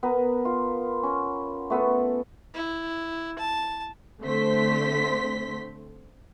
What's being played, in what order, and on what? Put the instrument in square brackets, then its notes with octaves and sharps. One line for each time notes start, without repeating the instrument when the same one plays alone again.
[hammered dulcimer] B3 A#4
F4
C#4
A3 B3 A4
[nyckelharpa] E4
A5
[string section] D3 A3 C4 C5 C6 B6